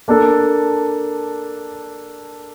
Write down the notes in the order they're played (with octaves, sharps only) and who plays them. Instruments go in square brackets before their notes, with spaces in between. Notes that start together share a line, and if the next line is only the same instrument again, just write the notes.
[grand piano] A#3 D4 A4